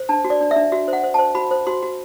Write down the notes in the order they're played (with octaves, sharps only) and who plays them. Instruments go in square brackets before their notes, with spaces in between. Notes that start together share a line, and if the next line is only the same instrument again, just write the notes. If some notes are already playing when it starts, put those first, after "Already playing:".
Already playing: [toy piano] C5
D4 A5
F#4
D5
D4
E5
D4
F#4 E5
C5
F#5
C5
C5 A5
F#4 B5
C5
F#4 C6
F#4